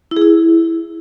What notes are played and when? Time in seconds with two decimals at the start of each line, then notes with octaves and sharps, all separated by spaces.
0.11 E4
0.16 G#4
0.22 E4